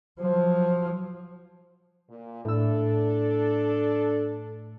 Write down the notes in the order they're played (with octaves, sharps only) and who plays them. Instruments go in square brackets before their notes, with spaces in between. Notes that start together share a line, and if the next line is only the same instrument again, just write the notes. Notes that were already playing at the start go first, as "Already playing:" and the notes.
[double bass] F3 F#3
[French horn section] A#2
[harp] A2 E6 [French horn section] D4 A4